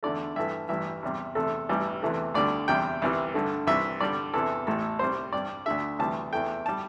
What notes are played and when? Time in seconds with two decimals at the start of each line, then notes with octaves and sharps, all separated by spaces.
0.03 E2 D3 A3 D5
0.36 G2 E3 A3 E5
0.69 A1 G2 E3 E5
1.03 E2 C3 G3
1.35 E2 C3 A3 A4
1.69 A1 G2 E3 G3
2.02 E2 C3 E3 A3
2.34 D2 D3 G3 D5
2.68 E2 C3 G3 G5
3.02 C2 C3 E3 G3
3.34 G2 D3 A3
3.67 C2 C3 E3 E5
4.01 G2 D3 G3 D5
4.34 E2 C3 E3 A4
4.67 A1 A2 A3 A4
4.99 C2 C3 G3 C5
5.33 G2 G3 D5
5.66 D2 D3 A3 E5
5.99 D2 C3 E3 G3 A5
6.33 E2 E3 A3 G5
6.66 G3 A5